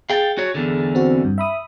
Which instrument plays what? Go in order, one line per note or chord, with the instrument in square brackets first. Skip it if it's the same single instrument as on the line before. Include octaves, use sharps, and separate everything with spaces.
[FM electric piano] G#4 A6 [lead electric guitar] F5 G5
[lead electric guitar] F#4 C#5
E2 D3
[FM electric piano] C4 F#4
G2
E5 B5 D#6